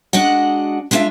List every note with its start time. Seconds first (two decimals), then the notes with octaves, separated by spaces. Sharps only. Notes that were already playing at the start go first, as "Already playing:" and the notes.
0.13 G#3 D4 F#4 D#5 F#5
0.91 G#3 B3 D4 F4 E5 F5